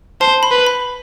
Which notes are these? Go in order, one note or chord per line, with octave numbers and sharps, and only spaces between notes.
C5 A5
B5
B4
B5